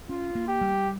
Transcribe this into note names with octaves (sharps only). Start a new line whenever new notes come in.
C#4 F4
A#3
G4
G3